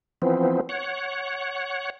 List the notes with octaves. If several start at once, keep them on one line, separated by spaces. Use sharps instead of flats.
E3 F3 B3 C4
C#5 F#5